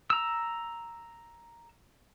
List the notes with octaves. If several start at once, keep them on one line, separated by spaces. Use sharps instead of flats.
A#5 E6